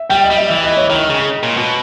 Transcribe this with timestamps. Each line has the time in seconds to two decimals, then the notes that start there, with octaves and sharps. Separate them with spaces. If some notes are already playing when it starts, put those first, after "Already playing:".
Already playing: E5
0.10 G3 G5
0.24 D#5
0.30 G3
0.37 E5
0.50 E3
0.64 D#5
0.77 C#5
0.89 D#3 D#5
1.10 C#3
1.43 A#2
1.57 B2